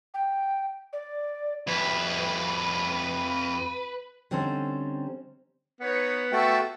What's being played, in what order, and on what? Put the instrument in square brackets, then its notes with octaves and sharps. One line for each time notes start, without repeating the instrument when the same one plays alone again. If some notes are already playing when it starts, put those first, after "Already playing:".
[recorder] G5
D5
[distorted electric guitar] F2 E4 [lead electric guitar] B4
[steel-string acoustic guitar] D3 G3 C4 C#4 D#4 C5
[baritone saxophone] B3 [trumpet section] D#4 B4 C#5
[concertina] A3 F#4 G5 [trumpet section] F4 A4 E5